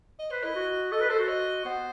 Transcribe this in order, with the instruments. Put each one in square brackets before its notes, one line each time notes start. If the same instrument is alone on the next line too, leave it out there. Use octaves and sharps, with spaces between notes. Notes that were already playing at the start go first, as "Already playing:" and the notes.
[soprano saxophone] D#5
[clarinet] B4 [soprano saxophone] C5
[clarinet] E4 [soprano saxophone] D#5
[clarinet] F#4
[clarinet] A4 [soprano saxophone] D#5
[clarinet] B4
[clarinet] A4 [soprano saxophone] C5
[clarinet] F#4
[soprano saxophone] D#5
[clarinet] B3 [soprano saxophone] C5